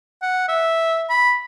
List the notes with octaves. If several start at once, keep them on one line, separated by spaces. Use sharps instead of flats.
F#5
E5
B5